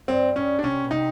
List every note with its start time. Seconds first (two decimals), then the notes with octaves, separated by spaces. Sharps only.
0.08 G2 C4
0.36 G2 C#4
0.59 D4
0.63 C3 C#4
0.84 B2
0.91 C3 D#4